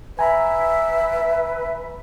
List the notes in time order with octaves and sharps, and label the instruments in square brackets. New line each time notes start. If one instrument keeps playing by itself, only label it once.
[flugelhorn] B4 [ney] E5 [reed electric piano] G#5 A#5 B5